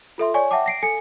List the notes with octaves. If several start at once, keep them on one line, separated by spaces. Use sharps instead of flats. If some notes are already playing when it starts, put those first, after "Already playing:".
F4 A4 E5 C6
C#5 D5 G#5 C#6
E5 F#5 G5 A5 D6
A#6 C7 D7
A4 G#5 C#7